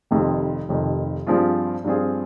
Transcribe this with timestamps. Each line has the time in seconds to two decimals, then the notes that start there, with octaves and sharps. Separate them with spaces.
0.11 F1 F2 C3 D#3
0.69 F1 F2 C3 D#3
1.27 G2 F3 C4 F4 G#4
1.84 G2 F3 C4 F4 G#4